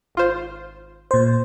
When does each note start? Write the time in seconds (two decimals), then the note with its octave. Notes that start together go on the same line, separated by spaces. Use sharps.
0.15 G#1 F4 C5
1.11 A#2 C5